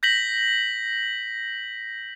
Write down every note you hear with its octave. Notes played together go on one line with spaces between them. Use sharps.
G6 A#6 B6 F#7